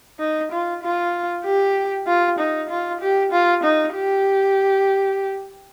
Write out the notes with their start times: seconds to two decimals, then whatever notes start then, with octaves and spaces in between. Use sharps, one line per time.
0.19 D#4
0.51 F4
0.83 F4
1.45 G4
2.07 F4
2.39 D#4
2.70 F4
3.01 G4
3.32 F4
3.64 D#4
3.95 G4